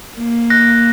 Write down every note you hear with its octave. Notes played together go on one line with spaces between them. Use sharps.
A#3
F#6 A#6